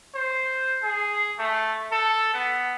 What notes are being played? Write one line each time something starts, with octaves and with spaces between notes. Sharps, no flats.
C5
G#4
A3
A4
B3